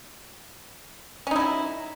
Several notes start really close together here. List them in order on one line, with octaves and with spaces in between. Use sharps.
C#4 D#4 E4 F#3